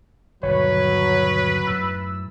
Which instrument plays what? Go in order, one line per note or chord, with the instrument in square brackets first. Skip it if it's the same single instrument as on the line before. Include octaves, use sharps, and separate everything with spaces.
[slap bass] G1 D#2 B2 [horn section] F#3 [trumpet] B4 [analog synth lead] C#5
[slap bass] F#2 A2 [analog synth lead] E6